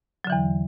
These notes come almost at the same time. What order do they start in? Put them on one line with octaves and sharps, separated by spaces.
F#3 D3 E3 E2